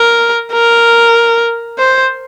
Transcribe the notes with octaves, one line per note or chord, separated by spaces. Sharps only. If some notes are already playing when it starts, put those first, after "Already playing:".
Already playing: A#4
A#4
C5